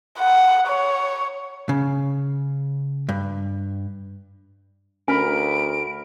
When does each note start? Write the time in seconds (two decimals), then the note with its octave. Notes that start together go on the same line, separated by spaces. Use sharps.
0.19 F#5
0.67 C#5
1.69 C#3
3.09 G2
5.08 D2 C#4 A#4 B5 D7